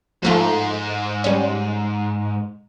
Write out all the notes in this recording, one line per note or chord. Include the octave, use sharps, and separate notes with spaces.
G#2 F3 A3 F4
G3 C#4